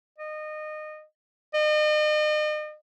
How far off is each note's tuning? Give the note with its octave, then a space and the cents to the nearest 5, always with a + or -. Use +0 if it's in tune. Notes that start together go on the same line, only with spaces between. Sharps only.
D#5 -25
D#5 -40